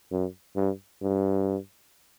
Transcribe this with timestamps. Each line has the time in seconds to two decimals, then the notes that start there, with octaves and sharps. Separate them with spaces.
0.11 F#2
0.56 G2
1.02 G2